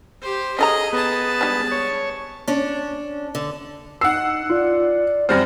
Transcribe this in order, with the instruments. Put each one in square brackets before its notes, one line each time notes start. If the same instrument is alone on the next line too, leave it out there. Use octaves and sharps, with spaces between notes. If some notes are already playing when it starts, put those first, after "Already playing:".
[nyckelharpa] G4 C5
[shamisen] C#4 A4 A#5 [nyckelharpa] G#4 D#5
[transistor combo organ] B3 [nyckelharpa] G#4 A5
[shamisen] G3 G#3 D4
[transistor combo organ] C#5
[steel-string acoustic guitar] C#4 D4
D3
[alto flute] D#4 [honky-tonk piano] F#5 C7 [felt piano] E6
[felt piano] F4 [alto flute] D5
[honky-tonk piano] F#2 G3 C4 [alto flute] D5 [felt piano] F6 A#6